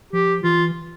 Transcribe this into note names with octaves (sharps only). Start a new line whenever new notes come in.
F3 G4
E3 F4